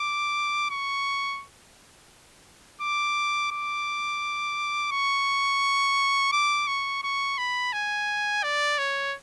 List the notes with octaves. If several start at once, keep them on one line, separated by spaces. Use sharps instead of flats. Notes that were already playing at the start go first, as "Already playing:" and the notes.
Already playing: D6
C#6
D6
D6
C#6
D6
C#6
C#6
B5
G#5
D5
C#5